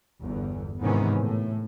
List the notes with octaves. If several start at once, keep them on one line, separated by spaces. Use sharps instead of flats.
G1 E2
G#2 C3 D#3 E3 B3 C#4
A2